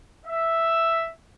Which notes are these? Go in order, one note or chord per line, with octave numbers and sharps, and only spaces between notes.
E5